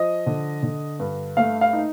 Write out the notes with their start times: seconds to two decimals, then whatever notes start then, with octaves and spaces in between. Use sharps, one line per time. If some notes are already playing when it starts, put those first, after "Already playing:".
Already playing: F3 D#5
0.26 D3
0.63 D3
1.00 G2
1.37 A3 F5
1.61 F5
1.73 D#4